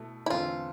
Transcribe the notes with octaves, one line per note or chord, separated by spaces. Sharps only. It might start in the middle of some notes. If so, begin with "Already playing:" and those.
Already playing: B2 A3 E4
E4
E2 D3 A3 C4 F4